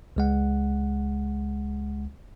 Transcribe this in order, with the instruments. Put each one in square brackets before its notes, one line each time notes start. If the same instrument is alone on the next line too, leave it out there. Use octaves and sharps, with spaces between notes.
[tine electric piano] C#2 G#3 F#5